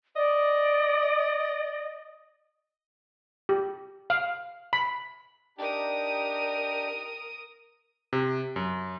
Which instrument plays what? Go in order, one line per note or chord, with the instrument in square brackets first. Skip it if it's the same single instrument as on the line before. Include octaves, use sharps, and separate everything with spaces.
[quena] D5 [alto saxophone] D#5
[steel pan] G4
F5
B5
[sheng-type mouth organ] D4 D#4 G4 [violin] A#4 D#6
[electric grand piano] C3
F#2